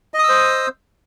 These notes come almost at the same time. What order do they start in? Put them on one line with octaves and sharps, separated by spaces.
D#5 D#6 E6 C5